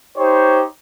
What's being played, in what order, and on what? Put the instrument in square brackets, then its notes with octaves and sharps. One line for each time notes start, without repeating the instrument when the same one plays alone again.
[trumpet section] D#4 G4 C5 C#5